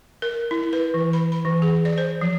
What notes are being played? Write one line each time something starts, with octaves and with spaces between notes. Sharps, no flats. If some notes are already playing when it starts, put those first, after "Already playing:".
A#4
E4
B4
E3
B5
B5
E3
G#4
D5
C5
F3